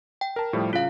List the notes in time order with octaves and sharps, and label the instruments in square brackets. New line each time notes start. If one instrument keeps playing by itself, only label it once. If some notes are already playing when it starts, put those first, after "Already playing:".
[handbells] G5
[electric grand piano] A#4 A5
A2 F3 G3
[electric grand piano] C#3 [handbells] F4 F5